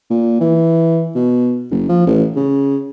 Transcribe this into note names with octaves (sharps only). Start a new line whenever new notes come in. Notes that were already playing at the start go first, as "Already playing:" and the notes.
A#2
E3
B2
F#1
F3
A1
C#3